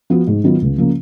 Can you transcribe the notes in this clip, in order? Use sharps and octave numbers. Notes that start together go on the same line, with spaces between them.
F3 B3 F#4
G#2
D#3 F#3 B3 F4
C#2
C#3 F3 A#3